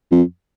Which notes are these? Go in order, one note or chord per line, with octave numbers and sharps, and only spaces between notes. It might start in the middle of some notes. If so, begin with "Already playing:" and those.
F2